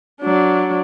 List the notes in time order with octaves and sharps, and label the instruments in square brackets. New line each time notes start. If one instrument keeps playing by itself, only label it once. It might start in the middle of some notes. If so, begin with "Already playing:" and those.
[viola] F#3 D4